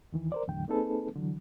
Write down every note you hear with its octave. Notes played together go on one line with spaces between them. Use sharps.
D#2 D#3 E3
A#4 C5 D5
E2 A2 D3 F#3 G5
A#3 C4 D#4 G#4 A4 B4
D3 E3 F#3